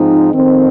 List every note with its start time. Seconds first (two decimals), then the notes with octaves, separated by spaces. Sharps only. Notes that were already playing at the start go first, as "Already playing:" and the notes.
Already playing: G#2 F3 C4 D#4
0.31 F2 D#3 C4